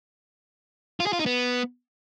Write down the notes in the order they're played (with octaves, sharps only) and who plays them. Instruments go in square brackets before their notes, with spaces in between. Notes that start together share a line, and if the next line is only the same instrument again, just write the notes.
[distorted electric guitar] F4
G#4
F4
D#4
B3